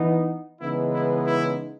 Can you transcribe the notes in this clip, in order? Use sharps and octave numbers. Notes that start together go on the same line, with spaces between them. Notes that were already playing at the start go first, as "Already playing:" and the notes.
Already playing: E3 B3 D#4
C#3 E3 G#3 B3 D#4 E4
E4
E4